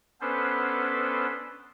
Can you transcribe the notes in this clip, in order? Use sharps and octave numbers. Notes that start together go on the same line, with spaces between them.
B3 C#4 D4 A4 B4 C5